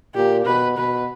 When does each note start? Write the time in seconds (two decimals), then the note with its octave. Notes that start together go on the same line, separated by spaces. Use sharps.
0.15 A#2 G4
0.46 B2 B4
0.78 B2 B4